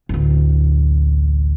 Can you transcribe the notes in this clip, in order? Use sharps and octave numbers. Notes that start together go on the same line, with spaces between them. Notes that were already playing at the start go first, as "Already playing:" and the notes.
A1 D2